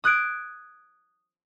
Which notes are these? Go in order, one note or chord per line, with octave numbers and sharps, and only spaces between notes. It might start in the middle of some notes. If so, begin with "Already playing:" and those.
D#6 F#6 G#6 D7